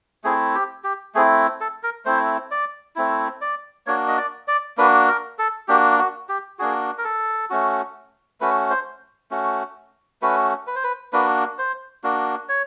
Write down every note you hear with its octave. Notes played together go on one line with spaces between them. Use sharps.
A3 C4 E4 G#4
G4
G4
A3 C4 E4 G#4
A4
A#4
A3 C4 E4 C5
D5
A3 C4 E4
D5
A#3 D4 F#4 C#5
D#5
D5
D5
A#3 D4 F#4 B4
A#4
A4
A#3 D4 F#4 G4
F#4
G4
A#3 D4 F#4 G#4
A#4
A4
A3 C#4 F#4
A3 C#4 F#4 B4
C5
A3 C#4 F#4
A3 C#4 F#4 B4
B4
C5
B4
A#3 D4 F#4 B4
C5
A#3 D4 F#4
C#5